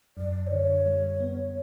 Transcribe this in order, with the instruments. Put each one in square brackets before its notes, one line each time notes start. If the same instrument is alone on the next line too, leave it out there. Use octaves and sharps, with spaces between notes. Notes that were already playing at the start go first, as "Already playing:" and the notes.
[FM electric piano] F#2 [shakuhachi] D5
[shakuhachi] C5
[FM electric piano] D3 [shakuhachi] C#5
[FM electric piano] G3
B3